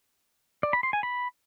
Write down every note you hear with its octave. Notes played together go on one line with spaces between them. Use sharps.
D5
B5
C6
G#5
B5